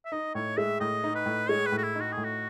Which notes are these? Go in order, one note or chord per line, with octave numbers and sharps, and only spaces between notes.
E5
D#4 D#5
A2 C#5
G#3 E5
A2 D#5
D#4
B4
A2
G#3 C#5
B4
A2
F#4
E4
D#4
F#4
A2 G#4
F#4